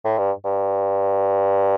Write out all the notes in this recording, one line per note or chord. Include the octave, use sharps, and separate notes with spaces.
A2
G2
G2